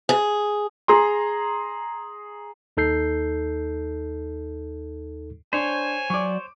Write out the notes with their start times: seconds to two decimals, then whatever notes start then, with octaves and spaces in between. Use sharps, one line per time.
0.09 G#4
0.88 G#4 A#5 C6
2.77 D#2 D#4 A4 G6 C7
5.53 D4 C5 C#5 G#5
6.10 F#3 D5 C#6 D6